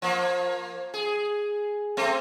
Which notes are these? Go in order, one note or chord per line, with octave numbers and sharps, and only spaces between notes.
F3 A#3
G#4
A3 C4